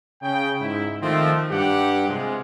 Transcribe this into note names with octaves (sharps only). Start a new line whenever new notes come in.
C#3 G5
G#2 E4
D#3 F3 A3 C4 F4
G2 G4 F#5
C3 G#3 F4